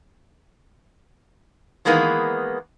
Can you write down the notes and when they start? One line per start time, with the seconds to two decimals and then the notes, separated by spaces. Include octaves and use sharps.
1.85 D#3 E3 G#3 A#3 B3